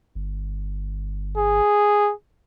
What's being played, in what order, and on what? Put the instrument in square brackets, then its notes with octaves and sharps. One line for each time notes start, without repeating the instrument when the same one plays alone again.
[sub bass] G1
[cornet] G#4